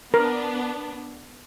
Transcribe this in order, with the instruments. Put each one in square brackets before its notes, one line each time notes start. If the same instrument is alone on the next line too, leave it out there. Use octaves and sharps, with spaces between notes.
[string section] B3 D4 [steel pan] A#4